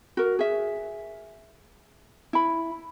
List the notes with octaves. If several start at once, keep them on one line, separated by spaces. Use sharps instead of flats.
F#4 A#4
G#4 E5
E4 B5